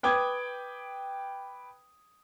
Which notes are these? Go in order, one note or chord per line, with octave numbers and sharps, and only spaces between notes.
B4 G5 D6 D#6 G#6